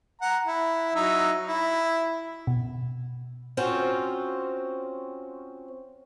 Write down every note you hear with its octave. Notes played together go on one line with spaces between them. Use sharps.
F#5 A#5
E4
F#3 D#4 E5
E4
B2
C4 C#4 F4 F#4 C5